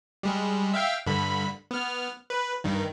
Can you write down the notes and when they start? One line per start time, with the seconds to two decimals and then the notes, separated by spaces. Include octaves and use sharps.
0.23 G3 G#3
0.74 E5 F5 G5
1.07 G2 D3 B5
1.71 B3 F6
2.30 B4
2.64 G2 D#3